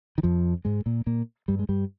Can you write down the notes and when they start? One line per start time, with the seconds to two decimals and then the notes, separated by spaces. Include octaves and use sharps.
0.18 D#3
0.23 F2 F3
0.65 G#2 G#3
0.86 A#2 A#3
1.06 A#2 A#3
1.48 G2 G3
1.59 G#3
1.69 G2 G3